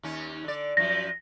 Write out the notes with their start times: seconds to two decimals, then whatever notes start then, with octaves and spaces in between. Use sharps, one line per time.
0.03 D#2 C#4
0.44 D3 D5
0.77 F#2 F3 A#6